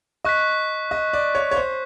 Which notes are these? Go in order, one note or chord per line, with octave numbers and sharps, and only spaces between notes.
D#5 C#6 F#6 B6
D#5
D5
C#5
C#5
C5